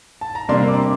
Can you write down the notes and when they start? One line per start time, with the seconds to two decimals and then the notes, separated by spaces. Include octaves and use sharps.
0.21 A5
0.35 A#5
0.49 C3 G3 A#3 D4 C6
0.68 D6